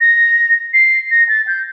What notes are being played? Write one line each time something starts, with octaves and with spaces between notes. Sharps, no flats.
A#6
C7
A#6
A6
G6